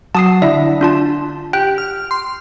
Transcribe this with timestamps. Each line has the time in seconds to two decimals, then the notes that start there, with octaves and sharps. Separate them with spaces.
0.15 F#3 A5 D#6 C7
0.42 D3 E4 E5
0.81 D4 F4 A5
1.53 G4 G5 F#6
1.78 F6
2.11 C6